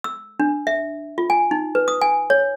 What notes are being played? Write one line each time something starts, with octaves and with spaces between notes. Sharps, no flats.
E6
D4
E5
F4
G#5
D#4
B4
D#6
G#5
C#5